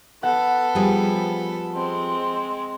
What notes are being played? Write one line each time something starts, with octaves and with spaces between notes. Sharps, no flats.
B3 A4 F#5
F3 G3 G#4
G#3 C4